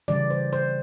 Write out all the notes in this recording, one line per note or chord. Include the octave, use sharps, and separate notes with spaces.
C#3 E3 G3 D5
C5
C5